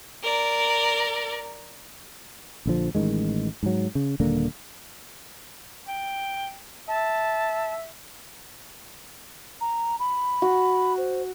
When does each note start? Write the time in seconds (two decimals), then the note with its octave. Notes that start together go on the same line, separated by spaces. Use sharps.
0.23 A#4 D5
2.66 A#1 D3 F3
2.95 A1 C3 D#3 G#3
3.63 G#2 F#3
3.95 C#3
4.20 D#1 D3 A#3
5.88 G5
6.88 E5 A5
9.61 A#5
9.99 B5
10.42 F#4
10.98 C5